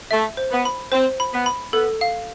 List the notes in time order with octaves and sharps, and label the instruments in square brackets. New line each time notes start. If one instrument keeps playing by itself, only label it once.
[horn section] A3 [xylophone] E5
[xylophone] C5
[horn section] B3
[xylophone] B5
[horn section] C4 [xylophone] C5
[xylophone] B5
[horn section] B3
[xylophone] B5
[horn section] B3 [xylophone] A4
[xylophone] F5